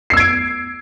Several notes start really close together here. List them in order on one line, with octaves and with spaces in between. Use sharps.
C7 E6 G#6 D7